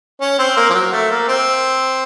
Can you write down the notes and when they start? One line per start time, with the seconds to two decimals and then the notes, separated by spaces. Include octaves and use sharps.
0.21 C#4
0.39 C4
0.57 A#3
0.70 F3
0.74 F#3
0.92 A3
1.11 A#3
1.28 C4